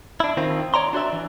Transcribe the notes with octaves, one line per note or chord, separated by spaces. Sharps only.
D4 E4
D#3 C4 F4
C#5 D5 A#5 C6
D4 F#4 D5 E5
E3